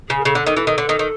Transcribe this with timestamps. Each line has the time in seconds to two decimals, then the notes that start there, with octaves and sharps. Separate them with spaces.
0.09 C#3 G#4
0.20 A#4
0.25 C#3 A4
0.35 D3
0.46 D#3
0.57 E3
0.67 D#3
0.78 D3
0.89 D#3
0.99 D#3